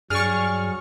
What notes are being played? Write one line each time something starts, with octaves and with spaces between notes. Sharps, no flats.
G2 F#3 G#4 D5 C#6 F6